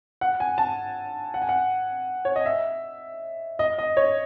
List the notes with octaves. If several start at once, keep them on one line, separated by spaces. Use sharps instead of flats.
F#5
G#5
A5
F#5
G#5
F#5
C#5
D#5
E5
D#5
D#5
C#5